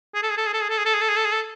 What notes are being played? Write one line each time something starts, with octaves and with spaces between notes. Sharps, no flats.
G#4
A4
G#4
A4
G#4
A4
G#4
A4
G#4
A4
G#4
A4
G#4
A4
G#4
A4